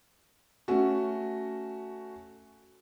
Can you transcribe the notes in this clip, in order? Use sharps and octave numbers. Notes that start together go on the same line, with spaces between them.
A3 C#4 F#4